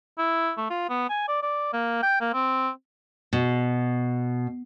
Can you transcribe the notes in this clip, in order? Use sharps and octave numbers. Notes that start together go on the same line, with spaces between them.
E4
A3
F4
B3
G#5
D5
D5
A#3
G5
A#3
C4
B2